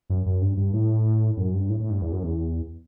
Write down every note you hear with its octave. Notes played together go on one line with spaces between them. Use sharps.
F#2
F#2
G2
G2
A2
F#2
G2
A2
A2
G2
E2
F#2
E2